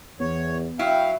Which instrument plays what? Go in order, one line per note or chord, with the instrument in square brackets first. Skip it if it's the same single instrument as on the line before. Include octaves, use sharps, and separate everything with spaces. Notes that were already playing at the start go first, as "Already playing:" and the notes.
[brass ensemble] E2 [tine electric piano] B3 [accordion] C#5
[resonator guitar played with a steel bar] F#3 E4 [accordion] F5 [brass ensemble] G5